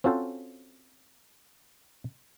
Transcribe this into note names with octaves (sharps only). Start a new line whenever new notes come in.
C4 C#4 F4 F#4 A4 C5